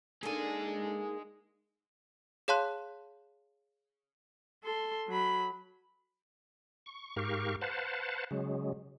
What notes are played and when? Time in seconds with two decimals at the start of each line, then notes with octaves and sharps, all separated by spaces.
0.23 G#3 A#3 D4 D#4 G#4 A4 G#5
2.48 G#4 C#5 F5 A5 C6 F#6
4.63 A4 C6
5.08 F#3 B5
6.86 C#6
7.16 G#2 G4 A#4 F5 C#6
7.61 B4 C5 F5 F#5 A5
8.31 C#3 F#3 G#3